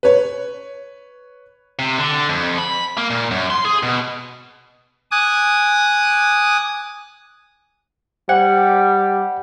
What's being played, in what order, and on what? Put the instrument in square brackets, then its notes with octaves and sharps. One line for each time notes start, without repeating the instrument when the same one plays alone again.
[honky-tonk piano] B4 C#5
[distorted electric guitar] C3
D3
F2
B5
A#3
A#2
F#2
C6
G#4
B2
[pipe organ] G#5 D6 D#6 F#6 G#6
[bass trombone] G3 [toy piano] C5 D5 G5 [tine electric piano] F#5